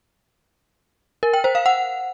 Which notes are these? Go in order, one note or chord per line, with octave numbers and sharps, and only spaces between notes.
A#4
G5
C5
F5
F#5